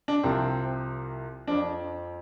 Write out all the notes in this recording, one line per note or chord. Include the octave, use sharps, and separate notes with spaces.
D4
C2 C3 F3 C4
F2 F3 D4